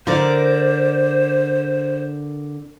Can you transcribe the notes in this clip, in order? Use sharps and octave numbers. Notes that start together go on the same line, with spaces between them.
D3 A#4 C5 D5